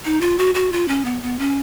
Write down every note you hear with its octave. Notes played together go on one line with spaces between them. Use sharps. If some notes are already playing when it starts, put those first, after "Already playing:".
D#4
F4
F#4
F#4
F4
C#4
B3
B3
C#4